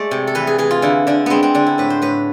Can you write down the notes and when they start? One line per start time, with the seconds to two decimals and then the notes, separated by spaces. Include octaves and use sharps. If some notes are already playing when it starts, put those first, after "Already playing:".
Already playing: G#3 A3 D5
0.11 C3
0.27 A4
0.35 E3 B4
0.47 G#4
0.58 E3 G#4
0.71 F4
0.82 D3 E4
1.07 D3 D4
1.26 G#3 B3 C4
1.43 C4
1.55 D3 D4
1.67 E4
1.78 A2 B4
1.90 C5
2.02 A2 B4